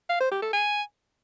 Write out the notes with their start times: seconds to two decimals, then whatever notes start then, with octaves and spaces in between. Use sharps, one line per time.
0.10 F5
0.21 C5
0.31 G4
0.42 A4
0.53 G#5